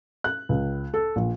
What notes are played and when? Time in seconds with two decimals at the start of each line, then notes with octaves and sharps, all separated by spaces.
0.24 F#6
0.49 C#2
0.94 A4
1.16 A#1